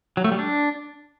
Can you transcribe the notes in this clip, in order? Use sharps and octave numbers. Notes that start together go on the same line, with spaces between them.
F#3
A3
G3
D4